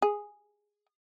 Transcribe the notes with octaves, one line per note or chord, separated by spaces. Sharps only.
G#4